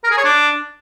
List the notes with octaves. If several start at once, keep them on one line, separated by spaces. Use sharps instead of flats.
A#4
G#4
C#5
D4